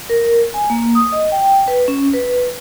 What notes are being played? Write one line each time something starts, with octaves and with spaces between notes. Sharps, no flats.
A#4
G#5
A#3
D#6
D#5
G5
B4
C#4
B4